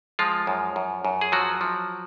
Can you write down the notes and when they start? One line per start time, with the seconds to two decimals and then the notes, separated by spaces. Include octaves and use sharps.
0.19 F3 G#3 F4
0.47 F#2
0.76 F#2
1.05 F#2
1.21 G#4
1.32 F3 F#3 F#4
1.61 F3